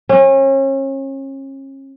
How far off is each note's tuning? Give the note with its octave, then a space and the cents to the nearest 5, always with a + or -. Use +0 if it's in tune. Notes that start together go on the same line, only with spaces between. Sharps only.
C#4 -35